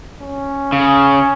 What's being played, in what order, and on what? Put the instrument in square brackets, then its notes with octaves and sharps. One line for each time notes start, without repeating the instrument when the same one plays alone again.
[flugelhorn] C#4
[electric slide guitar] C#3